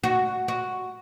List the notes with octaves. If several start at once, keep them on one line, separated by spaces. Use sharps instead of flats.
F#4
F#4